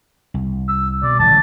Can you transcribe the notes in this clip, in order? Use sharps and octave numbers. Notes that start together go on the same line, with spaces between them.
C2
E6
B2 D5
D1 A1 F#3 A5